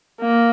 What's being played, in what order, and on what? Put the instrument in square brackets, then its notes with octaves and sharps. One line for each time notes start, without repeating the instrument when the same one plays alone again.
[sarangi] A#3